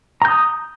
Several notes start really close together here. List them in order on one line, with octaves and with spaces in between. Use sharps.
A#5 G6 D#6